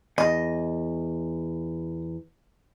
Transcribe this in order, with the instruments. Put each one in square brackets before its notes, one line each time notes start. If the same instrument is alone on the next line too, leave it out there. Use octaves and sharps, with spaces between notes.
[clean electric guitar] E2 [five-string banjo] D#5